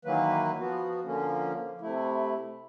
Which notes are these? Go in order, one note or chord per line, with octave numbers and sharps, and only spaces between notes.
D#3 E3 F#3 A#3 B4
F3 B3 F#4
D3 F3 A#3 C#4
C3 A3 E4